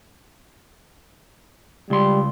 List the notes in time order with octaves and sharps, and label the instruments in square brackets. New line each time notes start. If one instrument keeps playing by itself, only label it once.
[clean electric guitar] C#2 C6 [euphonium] G3